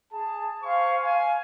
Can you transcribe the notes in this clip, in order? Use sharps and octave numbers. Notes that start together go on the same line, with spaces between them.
G#4 A5
C5 F5 G#5 C#6
F5 G#5